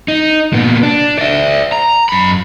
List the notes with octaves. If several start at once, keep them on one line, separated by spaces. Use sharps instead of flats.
D#4
A#2 B3
D4
D5 E5
A#5
F#2 B5